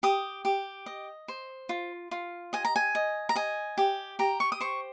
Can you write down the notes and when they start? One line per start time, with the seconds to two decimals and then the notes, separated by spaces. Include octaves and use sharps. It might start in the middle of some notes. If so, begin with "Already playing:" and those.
0.03 G4 D#6
0.45 G4
0.86 D#5
1.28 C5
1.69 F4
2.11 F4
2.53 D#5 G#5
2.65 A#5
2.76 G#5
2.95 D#5
3.29 A#5
3.36 D#5 G#5
3.78 G4
4.19 G4 A#5
4.40 C#6
4.52 D#6
4.61 C5 C#6